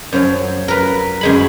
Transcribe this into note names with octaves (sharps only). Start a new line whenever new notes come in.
F#2 F3 F#3
A#4 B4
F#2 G#3 B5